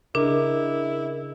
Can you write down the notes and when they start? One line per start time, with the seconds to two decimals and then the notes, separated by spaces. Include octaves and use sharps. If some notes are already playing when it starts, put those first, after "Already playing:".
0.15 C#3 D4 E4 G#4 A#4 D#5